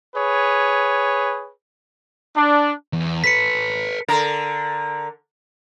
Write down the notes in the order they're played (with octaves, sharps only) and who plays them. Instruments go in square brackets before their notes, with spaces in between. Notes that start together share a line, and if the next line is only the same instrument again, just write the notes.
[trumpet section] G#4 B4 C#5
D4
[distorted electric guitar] E2
[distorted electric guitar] A4 B4 [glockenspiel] B6 C#7
[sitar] D3 A#4